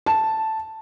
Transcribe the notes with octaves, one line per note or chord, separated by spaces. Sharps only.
A5